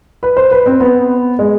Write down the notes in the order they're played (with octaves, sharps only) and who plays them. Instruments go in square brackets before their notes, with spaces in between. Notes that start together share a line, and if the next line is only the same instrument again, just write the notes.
[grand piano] B4
C5
B4
C4
B3
G#3